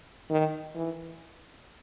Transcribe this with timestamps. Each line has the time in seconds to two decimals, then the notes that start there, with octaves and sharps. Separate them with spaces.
0.30 D#3
0.75 E3